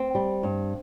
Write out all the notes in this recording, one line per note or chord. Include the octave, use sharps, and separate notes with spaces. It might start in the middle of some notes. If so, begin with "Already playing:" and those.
Already playing: C4
G3
G2